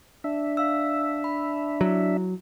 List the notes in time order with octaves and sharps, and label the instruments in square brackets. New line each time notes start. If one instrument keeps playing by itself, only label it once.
[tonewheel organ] D4 E5
[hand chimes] F5 E6
B5
[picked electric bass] F#3 [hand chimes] E4